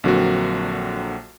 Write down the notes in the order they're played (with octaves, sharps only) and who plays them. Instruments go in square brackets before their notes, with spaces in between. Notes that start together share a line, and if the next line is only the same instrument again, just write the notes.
[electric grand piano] A#1 D3 F#3 A#3 C4 F#4